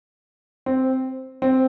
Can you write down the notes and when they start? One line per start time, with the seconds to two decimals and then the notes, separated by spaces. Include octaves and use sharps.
0.66 C4
1.42 C4